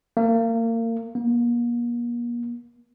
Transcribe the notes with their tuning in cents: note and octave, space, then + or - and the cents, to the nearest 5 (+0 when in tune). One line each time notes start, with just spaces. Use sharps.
A#3 -30
A#3 +40